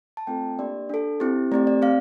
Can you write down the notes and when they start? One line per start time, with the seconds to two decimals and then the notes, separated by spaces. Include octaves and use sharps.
0.17 A5
0.27 A3 C4 F4 A4 G5
0.59 A#3 D4 G4 D5
0.89 D4 A4
1.20 C4 E4 G4
1.52 A3 C4 G4 D5
1.67 D5
1.82 C4 F5